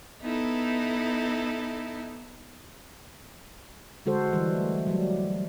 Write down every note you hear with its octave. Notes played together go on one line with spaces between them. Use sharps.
B3 D#4 E4 A4
D3 G#3 F#4 A4 C5
E3 G3
A3
F#3 G3